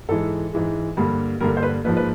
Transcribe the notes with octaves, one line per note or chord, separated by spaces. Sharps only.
G#2 E3 G#3 A4
G#2 E3 G#3
G2 D3 G3 A#3
G2 D3 G3 A#3 A#4
C5
B4
G#2 F3 A#3 B4
B4